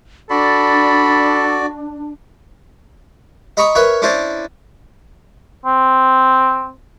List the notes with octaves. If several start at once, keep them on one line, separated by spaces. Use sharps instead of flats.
D4 F#4 A4 D5 B5
D#5 A#5 B5 C#6 D#6
A#4 B4 C#5 E5
C#4 D4 E4 C5 D5
C4